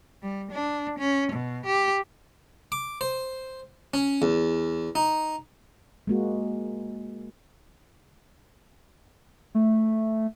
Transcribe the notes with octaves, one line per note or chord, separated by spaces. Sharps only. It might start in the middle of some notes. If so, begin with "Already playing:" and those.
G3
D4
C#4
B2
G4
D6
C5
C#4
E2
D#4
G#3 A#3 F#4
A3